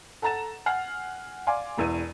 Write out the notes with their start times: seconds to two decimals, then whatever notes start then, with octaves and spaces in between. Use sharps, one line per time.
0.22 A4 F#5 A#5 A6 E7
0.66 F#5 G#5 F6 C7
1.47 D5 F5 G#5 C6 D6
1.78 E1 E2 E6 D#7